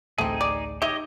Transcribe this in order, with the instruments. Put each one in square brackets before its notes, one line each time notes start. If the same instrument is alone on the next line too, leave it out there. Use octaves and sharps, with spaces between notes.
[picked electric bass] A1 D2 A2 [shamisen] A3 C4 [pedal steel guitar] D#4 G#4
[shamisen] D5
[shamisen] D#4 E5 [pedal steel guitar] G4 C#5 D#5